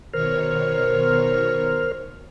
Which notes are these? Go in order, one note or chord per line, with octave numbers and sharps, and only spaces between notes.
B2 D#3 A#4 C5 C#5 F6